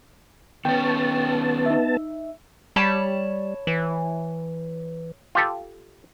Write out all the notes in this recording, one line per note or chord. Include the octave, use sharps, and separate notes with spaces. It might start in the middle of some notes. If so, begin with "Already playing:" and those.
D#3 B3 C#4 G5 A5
D#4 E5
G3 C#5 A5 B5
E3
F4 G4 A4